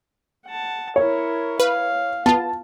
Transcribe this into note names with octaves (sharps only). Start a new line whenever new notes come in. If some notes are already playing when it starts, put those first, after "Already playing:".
F#5 A5
E4 A#4 C#5
B4 F5
B3 F4 A5